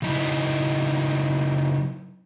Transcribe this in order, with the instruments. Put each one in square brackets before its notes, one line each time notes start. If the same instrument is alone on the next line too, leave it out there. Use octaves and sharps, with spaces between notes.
[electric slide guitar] C#3 F#3 D#4 E4